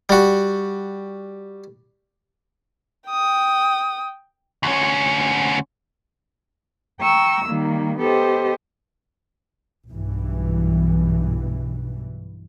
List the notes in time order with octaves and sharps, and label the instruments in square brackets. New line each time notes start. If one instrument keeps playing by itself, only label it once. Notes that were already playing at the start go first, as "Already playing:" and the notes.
[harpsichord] G3 F#4
[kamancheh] G5 D#6
[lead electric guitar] D2 C#4
[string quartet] G5 A#5 C#6 E6
D#3 G3 A#3
B3 G4 A4 C5 D#5
[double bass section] B1 G2 B2 E3